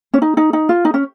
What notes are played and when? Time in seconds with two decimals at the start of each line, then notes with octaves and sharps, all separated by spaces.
0.14 C#4
0.22 D#4
0.37 D#4
0.53 D#4
0.69 F4
0.85 D#4
0.94 C#4